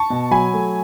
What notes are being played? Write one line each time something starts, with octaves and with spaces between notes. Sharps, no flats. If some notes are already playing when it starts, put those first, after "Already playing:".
Already playing: A5 C#6
B2
F#3 G#5 B5
A3